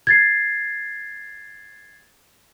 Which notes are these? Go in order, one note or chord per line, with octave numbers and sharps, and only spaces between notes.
G#6 A6 C7